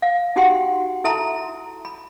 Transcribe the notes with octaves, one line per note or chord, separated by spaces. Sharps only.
F5
D#4 F#4 G4 F#5 G5 C6
E4 A4 E5 A5 A#5 C6
B5